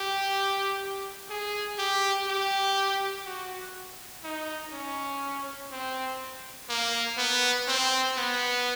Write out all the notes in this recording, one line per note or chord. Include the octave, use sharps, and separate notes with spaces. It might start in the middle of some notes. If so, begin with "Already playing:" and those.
Already playing: G4
G#4
G4
G4
F#4
D#4
C#4
C4
A#3
B3
C4
B3